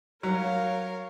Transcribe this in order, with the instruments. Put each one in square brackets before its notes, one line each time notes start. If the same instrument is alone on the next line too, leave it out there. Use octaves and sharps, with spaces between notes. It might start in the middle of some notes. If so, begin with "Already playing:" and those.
[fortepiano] F#3 [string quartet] A#4 C#5 F5